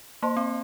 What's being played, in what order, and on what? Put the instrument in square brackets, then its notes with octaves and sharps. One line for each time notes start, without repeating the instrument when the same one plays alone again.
[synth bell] A#3 [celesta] C5 D#5 A5 C6
[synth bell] C4